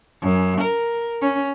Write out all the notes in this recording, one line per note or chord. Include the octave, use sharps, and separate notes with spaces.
F#2
A#4
C#4